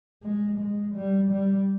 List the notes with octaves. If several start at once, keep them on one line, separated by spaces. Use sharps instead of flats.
G#3
G#3
G3
G3